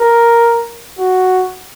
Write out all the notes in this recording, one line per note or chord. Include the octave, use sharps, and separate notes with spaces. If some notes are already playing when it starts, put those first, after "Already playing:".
Already playing: A#4
F#4